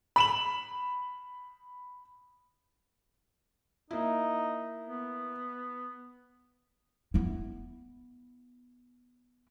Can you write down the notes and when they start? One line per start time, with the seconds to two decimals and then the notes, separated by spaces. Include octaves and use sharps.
0.16 B5 E7 F#7
3.91 A#3 D#4 E4
4.89 B3
7.14 B3 E4